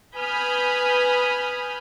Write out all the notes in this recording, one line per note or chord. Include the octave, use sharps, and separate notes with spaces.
B4 G#5 B5 D#6 F6 G6